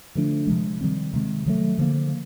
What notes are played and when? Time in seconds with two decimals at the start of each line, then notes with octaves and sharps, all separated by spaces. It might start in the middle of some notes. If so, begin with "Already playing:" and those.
0.15 D3 F3 A3 D4
0.47 C3 F3 G#3
0.81 D#3 G3 C4
1.14 C3 D#3 G#3
1.46 D#3 F#3 A3
1.78 D3 F3 A#3